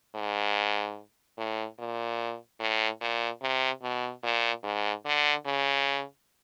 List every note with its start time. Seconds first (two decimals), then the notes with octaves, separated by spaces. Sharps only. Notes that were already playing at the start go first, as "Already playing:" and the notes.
0.15 G#2
1.38 A2
1.79 A#2
2.60 A2
3.01 A#2
3.42 C3
3.82 B2
4.23 A#2
4.64 G#2
5.06 D3
5.46 C#3